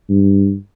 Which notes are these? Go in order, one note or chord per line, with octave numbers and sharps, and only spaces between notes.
G2